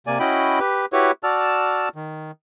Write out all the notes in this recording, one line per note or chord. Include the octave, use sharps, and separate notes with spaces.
C3 A#3 D5 G#5
C#4 E4 F#4 D#5 G5 B5
G4 B4
E4 F#4 G4 B4 C#5
F#4 D5 A5 E6 F6
D#3